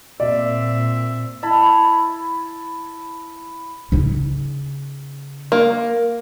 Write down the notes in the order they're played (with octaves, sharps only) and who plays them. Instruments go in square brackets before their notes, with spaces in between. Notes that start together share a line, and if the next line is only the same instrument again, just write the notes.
[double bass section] A#2 [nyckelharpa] C4 E5 [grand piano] D5
[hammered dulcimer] E4 A5 B5
[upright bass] C#3 D#4
[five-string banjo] A#3